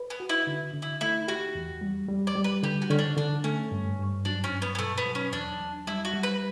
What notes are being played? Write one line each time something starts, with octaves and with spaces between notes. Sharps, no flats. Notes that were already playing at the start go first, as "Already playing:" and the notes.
Already playing: B4
B3
F#4
E4
D3
D3
E4
A3 E4
F#4 G4
E2
G3
G3
D5
G3
B4
D3 G4
F#4
D3 C#4
D4
D3 D4
A3 C#4
G2
G2
F#3 D4
C#4
G2
B3
B3
B2 A3
B3
F#3
C#4
E2 D4
F#3
G3 E4
F#4
G3
B4